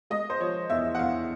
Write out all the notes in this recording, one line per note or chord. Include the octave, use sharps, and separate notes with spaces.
G#3 D#5
C5
F3 C#5
E2 E5
F#5
E2 F5